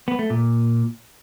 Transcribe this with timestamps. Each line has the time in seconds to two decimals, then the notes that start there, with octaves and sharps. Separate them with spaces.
0.08 B3
0.19 A3
0.30 A#2